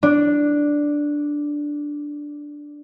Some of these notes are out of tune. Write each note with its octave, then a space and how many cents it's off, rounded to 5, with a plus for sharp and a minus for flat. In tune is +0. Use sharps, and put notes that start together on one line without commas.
D4 +0